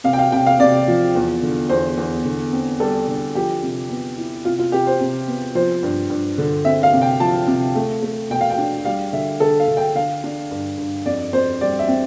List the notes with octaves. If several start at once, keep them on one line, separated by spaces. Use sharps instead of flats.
C3 F5
G5
F5
C3 G5
F5
C3 D5
F3
E2
D3
E2 C5
E2
D3
C4
G3 A4
D3
F3 G4
C3
B3
E4
C3 F4
F4
C3 G4
C5
C3
B3
F3 C5
G2
G2
D3
C4 E5
F5
C3
G5
F3 A5
C3
A3
A3
B2 G5
F5
G5
D4
G3 F5
D3 E5
D3 A4
F5
D3
G5
D3 F5
D4
G2
G2
F2 D5
F2 C5
G3 D5
E5
C4